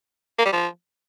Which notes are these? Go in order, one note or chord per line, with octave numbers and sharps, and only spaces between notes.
A#3
G3
F3